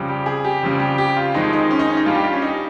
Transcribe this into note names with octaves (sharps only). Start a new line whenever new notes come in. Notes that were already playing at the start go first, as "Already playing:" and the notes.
Already playing: F2 C#3 G3
G4
G#4
G4
F2 C#3 G3
G4
G4
F4
F2 D#3 G#3 D#4
D#4
C#4
D#4
C#4
D#4
G2 G3 F4
G4
F4
C#4
D#4